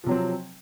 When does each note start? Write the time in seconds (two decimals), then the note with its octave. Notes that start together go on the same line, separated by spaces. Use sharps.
0.04 F3
0.06 C3
0.09 F#3
0.11 C4